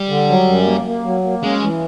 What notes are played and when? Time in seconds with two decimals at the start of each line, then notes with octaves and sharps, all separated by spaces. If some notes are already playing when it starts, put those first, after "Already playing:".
Already playing: G3
0.09 D3
0.29 F#3
0.47 F#2
0.66 A#3
0.86 A#3
1.04 F#3
1.23 A#3
1.43 G#3 C#4
1.62 E3